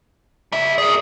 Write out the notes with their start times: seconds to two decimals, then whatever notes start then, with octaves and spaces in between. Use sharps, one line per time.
0.52 G3 E5
0.78 G#4 A#4 D5